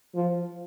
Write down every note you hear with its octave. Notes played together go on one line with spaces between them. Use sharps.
F3